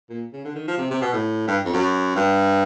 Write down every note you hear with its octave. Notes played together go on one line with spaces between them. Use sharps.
A#2
C#3
D3
D#3
F3
C3
C3
B2
A2
G2
F2
F#2
G2